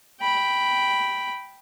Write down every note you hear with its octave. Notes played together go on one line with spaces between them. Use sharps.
G5 B5